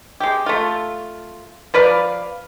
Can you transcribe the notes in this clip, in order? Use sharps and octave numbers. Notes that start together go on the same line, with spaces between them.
G#3 G4
A3 F4
F3 B4 D5 F5